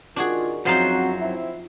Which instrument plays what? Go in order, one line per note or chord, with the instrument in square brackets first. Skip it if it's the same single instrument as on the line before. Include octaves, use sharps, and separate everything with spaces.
[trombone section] D#3 [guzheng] D4 F#4 G#4 [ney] F4
[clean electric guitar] F#2 F#3 C5 [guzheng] F3 D#4 [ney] C4 [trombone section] F#4
[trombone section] C4 E4 [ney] E5